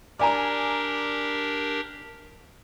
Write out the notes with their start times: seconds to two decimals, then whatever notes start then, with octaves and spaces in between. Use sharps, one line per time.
0.19 D4 G4 A#4 D5 G#5 A#5